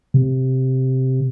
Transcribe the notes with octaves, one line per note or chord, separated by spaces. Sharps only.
C3